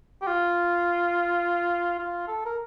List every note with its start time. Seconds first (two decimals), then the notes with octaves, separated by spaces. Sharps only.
0.22 G4
0.27 F4
1.99 F4
2.28 A4
2.45 A#4